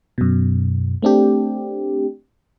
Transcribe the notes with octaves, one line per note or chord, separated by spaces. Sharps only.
F#2 B2
A3 C4 D4 G4